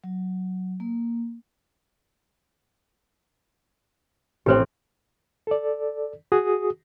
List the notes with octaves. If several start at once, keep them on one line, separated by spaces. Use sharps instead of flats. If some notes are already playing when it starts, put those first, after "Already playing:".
F#3
A#3
A1 C4 G4 B4 C5
A4 D5
F#4 G#4 D#6